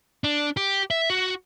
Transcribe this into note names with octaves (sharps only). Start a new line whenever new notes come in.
D4
G4
E5
F#4